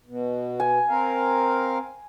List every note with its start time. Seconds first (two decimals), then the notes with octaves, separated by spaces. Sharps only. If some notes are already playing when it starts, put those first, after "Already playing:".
0.06 B2
0.60 G#5
0.89 C4 A#4 F5